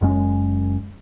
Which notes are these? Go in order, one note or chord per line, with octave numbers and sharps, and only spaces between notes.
F#1 F#2 G#3 C#4